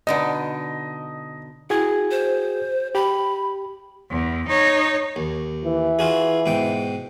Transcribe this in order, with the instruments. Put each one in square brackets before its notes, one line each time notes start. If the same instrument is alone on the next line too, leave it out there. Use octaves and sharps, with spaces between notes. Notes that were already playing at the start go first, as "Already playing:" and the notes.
[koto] B2 D3 D#4 [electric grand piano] D#5
[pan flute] E4 [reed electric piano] F#4 G#4 G#6
[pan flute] C5
[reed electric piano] G4 [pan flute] B5
[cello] E2
D#4 C#5
[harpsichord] D#2
[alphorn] E3
[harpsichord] F4 F#4 G#4
G#2 B2 G5